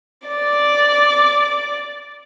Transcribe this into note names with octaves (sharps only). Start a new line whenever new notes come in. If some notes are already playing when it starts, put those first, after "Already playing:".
D5 D6